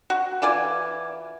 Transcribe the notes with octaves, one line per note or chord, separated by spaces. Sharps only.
F#4
E3 F4 D5 G#5